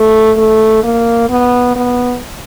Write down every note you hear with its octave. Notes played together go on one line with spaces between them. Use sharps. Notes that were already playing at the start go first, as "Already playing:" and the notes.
Already playing: A3
A3
A#3
B3
B3